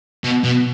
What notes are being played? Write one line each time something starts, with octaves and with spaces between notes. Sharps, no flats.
B2
B2